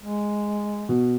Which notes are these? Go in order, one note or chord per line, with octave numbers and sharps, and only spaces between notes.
G#3
B2